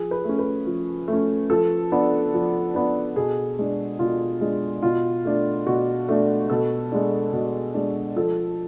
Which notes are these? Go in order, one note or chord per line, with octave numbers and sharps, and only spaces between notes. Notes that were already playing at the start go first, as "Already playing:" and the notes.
Already playing: F3 G#4
B4
A3 C#4
B4
F3
A3
C#4
F3 A4
B3 D4
F3
B3 D4
B2 G#4
G#3 D4
B2 F4
G#3 D4
B2 F4
A3 D4
B2 F#4
A3 D4
B2 A4
G#3 D4
B2
G#3 D4
F3 A4